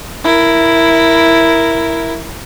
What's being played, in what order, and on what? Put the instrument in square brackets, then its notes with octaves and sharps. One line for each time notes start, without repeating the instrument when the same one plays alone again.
[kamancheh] E4 A#4